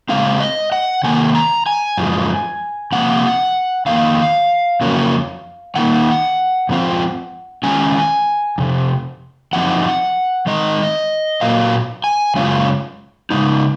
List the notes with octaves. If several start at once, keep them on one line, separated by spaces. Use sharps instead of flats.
C#3 G#3 C4 F5
D#5
F#5
C3 D#3 A#3 G#5
A#5
G#5
F#2 F3 G#3
C3 F3 A#3 F#5
F2 D#3 A#3 F5
F2 C#3 F#3 A#3 C#4
D#3 A#3 D#4 F#5
G#2 F3 C4 F4
D#3 G#3 C#4 G#5
F2 C3
F#2 F3 C4 D#4 F#5
D#3 G#3 D#4 D#5
A#2 F#3 A#3 F5
G#5
F#2 C#3 G#3 C#4 F4
C#3 G#3 D#4